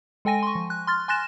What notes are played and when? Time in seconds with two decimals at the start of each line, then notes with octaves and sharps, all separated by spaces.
0.25 G#3 A4 G5 G#5 A#6 D#7
0.43 C6 C#6
0.55 F3
0.70 F#6
0.87 C6 F6 A6
1.08 G#5 C6 F#6 A6 A#6 E7